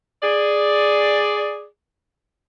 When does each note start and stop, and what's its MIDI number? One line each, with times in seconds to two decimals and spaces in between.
0.23 1.65 68
0.23 1.65 74